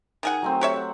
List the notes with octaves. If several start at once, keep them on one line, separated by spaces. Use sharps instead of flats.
D#3 G#4 F#5
F#3 A3 C4
G4 C#5 E5
F#5